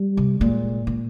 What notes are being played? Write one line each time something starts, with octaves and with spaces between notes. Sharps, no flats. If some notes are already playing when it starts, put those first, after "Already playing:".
Already playing: G3
C3
A#2 G#3
A#2